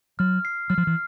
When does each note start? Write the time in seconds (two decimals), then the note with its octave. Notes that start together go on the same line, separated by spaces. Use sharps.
0.19 F#3 F6
0.45 C7
0.70 F#3 F6
0.78 F3
0.87 E3